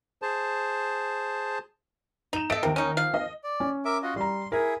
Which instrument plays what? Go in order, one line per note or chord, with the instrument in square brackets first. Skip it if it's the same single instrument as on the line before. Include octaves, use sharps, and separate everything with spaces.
[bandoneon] G#4 C5 A5
[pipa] D#4 [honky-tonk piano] E7 F7
[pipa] A3 A4 [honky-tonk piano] D#5 D7
[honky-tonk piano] D#2 A#4 [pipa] C3
[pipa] C#4 D#4
F3 F5
[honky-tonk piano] D#5
[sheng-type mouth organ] D5
[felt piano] C#4
[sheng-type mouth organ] A#4 E5 D6
F4 F#4 D#5
[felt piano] G3 A#5 [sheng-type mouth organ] C6
[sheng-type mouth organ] E4 G#4 [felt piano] A#4